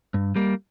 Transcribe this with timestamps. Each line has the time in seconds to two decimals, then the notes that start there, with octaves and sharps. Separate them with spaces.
0.14 G2
0.36 G3 A#3